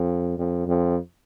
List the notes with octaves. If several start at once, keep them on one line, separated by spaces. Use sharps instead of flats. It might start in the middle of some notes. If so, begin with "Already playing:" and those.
Already playing: F2
F2
F2